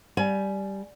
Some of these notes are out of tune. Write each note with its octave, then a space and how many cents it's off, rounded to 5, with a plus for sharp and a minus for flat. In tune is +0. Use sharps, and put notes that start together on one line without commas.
G3 +0 G#5 +20